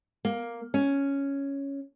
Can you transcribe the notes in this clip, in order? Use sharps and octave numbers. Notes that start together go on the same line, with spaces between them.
A#3
C#4